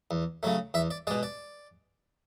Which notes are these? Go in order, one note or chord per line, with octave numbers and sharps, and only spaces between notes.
E2
C#3 F#3 A3
E2 E5
D5
B2 G#3 D5
D5